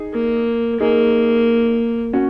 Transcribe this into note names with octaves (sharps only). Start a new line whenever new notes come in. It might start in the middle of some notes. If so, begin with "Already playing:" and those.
Already playing: D#4 G#4
A#3
A#3 D#4 G#4
C#4 F#4